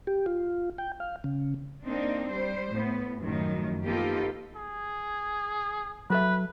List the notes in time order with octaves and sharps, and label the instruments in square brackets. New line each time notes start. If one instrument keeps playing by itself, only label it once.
[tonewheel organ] G4
F4
G5
F5
C#3
[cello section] A#3 C4 D4 D#4
G3 C5
A2 B3
F#2 A2 D#3 F3 F#3
A#3 B3 D#4 F4 G4 A4
[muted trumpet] G#4
[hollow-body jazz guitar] F#3 A4 E5 [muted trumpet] B4